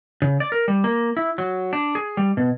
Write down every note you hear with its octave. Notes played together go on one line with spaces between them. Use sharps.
C#3
D5
A#4
G3
A#3
E4
F#3
D4
G#4
G3
B2